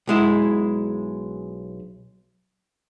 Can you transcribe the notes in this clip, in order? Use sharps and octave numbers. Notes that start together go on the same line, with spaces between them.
B1 G#3 E4